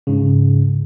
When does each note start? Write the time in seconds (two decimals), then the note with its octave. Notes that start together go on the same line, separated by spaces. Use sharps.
0.07 G#2 C#3